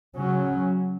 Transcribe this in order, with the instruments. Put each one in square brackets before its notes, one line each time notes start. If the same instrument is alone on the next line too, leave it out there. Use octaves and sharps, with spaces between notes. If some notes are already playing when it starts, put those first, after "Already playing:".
[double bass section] C#3 F#3 C#4